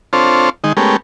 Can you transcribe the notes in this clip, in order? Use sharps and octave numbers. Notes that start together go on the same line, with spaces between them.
C4 D4 F4 A4 C5 C#5
D#3 G#3 D#4
G#3 A3 B3 C#4 G4 A#4